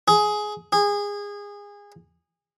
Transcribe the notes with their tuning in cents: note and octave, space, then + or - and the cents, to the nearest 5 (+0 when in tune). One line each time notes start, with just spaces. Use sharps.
G#4 +15
G#4 -25